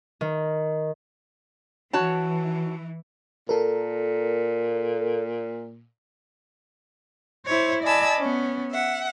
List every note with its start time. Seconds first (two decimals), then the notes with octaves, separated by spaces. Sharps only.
0.21 D#3
1.93 E3 F#4 C#5 A5
3.49 A#2 A4 A#4
7.45 E4 C5 C#5
7.84 D5 D#5 G#5 A5 B5 E6
8.19 B3 C#4
8.72 E5 F#5